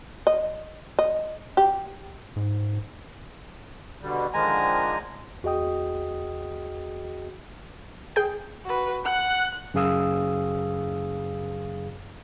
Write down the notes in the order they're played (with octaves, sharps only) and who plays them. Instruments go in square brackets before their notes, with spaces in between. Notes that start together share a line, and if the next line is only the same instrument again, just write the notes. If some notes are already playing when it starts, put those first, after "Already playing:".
[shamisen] D#5
D#5
G4
[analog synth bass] G#2
[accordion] B2 D3 G3
[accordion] D3 D#3 F3 [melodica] G#3 G#5 A#5
[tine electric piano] E2 F#4 G#4 D#5 G5 D#6
[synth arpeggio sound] G#4 G5
[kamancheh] F#4 B4
[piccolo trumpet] F#5 [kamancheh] F#6
[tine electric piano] F#2 C#3 G#4 F5 D#6 E6